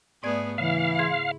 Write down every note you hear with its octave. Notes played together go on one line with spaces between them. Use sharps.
G#2 A3 B3 G#4 D5 G#6
C#3 E3 E4 F5
G#4 C6